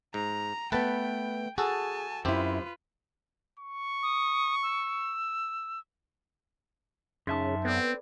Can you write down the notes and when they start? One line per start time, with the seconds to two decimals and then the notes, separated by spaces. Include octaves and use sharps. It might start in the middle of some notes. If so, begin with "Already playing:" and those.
0.14 G#2 A#5
0.72 A3 B3 B4 G5 A5
1.58 F#4 G#4 A4 G#5 A5
2.25 F#2 C4 E4 F4 G4 B4
3.60 C#6
4.03 D#6
4.63 E6
7.27 F#2 C#3 D#4 E5 A5 C6
7.65 B3 C4 A4 B4 D5